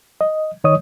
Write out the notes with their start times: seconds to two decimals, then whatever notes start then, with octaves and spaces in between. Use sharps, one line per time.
0.21 D#5
0.64 C#2 D#3 C#5 D#5 D#6